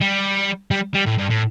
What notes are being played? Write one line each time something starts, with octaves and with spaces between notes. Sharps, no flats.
G3
G3
G3
A2
G2
A2